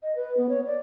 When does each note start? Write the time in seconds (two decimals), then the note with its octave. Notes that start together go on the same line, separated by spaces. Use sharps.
0.03 D#5
0.16 B4
0.37 B3
0.49 C#5
0.66 D5